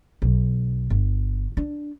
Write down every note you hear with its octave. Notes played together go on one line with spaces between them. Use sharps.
B1
G1
D4